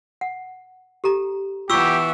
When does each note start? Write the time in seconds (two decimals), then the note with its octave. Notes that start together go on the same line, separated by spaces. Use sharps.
0.21 F#5
1.04 G4 A4 A#5
1.70 E3 B3 F4 G4 E5 C#6 E6